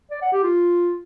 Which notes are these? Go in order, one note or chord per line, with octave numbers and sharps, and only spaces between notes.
D5
F#5
G4
F4